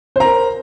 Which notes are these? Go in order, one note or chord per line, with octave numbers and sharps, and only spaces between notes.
A#4 C5 A#5